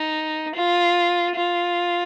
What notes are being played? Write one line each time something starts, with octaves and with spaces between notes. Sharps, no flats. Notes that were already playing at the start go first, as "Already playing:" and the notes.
Already playing: D#4
F4
F4